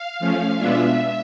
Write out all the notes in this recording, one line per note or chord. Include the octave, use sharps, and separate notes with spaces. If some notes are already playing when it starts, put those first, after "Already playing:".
Already playing: F5
F3 A3 C#4
B2 G#3 B3 D4 F4 E5